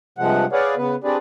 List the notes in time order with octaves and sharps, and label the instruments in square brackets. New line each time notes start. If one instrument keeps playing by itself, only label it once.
[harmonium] G2 C3 F3 G#3 F#5
G#4 B4 C#5 D5 F5 F#5
C#3 B3 B4
C4 D4 G4 G#4 B4 D5